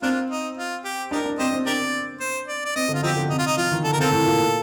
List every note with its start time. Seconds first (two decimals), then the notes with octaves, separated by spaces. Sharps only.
0.02 A#3 C4 D4 F4
0.30 D#4
0.57 F4
0.85 G4
1.11 D4 D#4 G4 A#4
1.25 D4
1.39 C4 G4 C5 D#5
1.53 C4
1.66 D4 G4 A#4 D5
2.20 C5
2.48 D5
2.65 D5
2.76 C4 D#5
2.89 D3
2.94 F4
3.03 F3 C4 D#4 G4
3.16 D3
3.30 C3 D#4
3.39 F4
3.47 D#4
3.57 F3 F4
3.71 D#3
3.84 D3 A4
3.93 A#4
3.98 C3 C4 F4 A4
4.12 A2
4.25 A#2